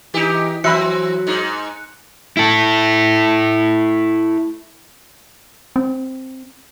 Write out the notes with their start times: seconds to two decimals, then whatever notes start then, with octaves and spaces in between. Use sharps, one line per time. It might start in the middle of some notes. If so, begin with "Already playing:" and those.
0.14 E3 D#4 G4
0.64 E3 F#3 C4 E5 B5 F#6 C#7
1.27 G#2 D#4
2.37 E4 A4
5.76 C4